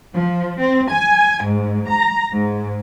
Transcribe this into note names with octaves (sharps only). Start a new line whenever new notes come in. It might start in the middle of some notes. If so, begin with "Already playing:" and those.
F3
C4
G#5
G#2
A#5
G#2